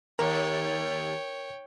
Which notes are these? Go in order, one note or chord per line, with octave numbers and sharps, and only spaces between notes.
D#2 A#4 C#5 G5